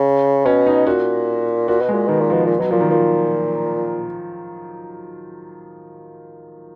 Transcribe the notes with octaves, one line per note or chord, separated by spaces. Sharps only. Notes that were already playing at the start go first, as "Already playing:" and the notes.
Already playing: C#3
B2 C#4
D#4
A#2 F#4
A#2 F#4
B2
G#3
A#2
B2 D#3
A#2
B2 F3
A#2
B2 F#3
A#2 F3
D#3
A#2 F3